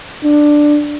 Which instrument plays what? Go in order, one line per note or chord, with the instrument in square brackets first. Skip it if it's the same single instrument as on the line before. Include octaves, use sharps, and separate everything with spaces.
[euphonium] D4